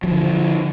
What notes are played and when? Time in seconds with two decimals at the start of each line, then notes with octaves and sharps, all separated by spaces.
0.04 F#3
0.07 F3
0.11 D3